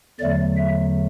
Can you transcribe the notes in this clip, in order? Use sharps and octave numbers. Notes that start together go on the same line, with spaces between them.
E2 D3 F#3 A3 D5
E5